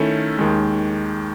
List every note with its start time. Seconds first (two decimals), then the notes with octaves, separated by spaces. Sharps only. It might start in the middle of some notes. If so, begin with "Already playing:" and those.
Already playing: D#3 A3 C#4 E4 A4
0.39 D#2 D#3 G#3